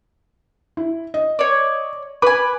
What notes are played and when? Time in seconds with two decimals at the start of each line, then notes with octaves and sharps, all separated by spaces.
0.77 E4
1.14 D#5
1.39 C#5 D5
2.22 B4 G#5 D6